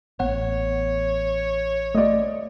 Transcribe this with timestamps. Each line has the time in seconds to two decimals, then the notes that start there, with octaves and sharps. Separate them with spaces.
0.20 A1 B3 C#5 F#5
1.95 A3 D5 D#5